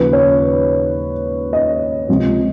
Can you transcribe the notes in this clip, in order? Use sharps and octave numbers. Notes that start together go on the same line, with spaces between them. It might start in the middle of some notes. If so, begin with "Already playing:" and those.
Already playing: D#2 C#3 F3 B4
C#5
D#5
C#2 C3 F3